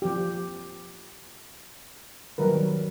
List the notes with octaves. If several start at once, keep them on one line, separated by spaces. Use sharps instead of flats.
F3 G4
D#3 F#3 G3 A#4 B4